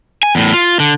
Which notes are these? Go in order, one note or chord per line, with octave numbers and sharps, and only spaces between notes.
G#5
E2 A2
F4
D3